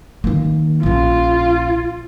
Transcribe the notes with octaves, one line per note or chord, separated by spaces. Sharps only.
D#3 A#3
A#1 C#4 F4